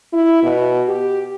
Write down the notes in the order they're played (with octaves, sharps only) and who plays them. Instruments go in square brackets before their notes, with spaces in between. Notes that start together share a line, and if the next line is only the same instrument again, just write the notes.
[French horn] E4
B2
G4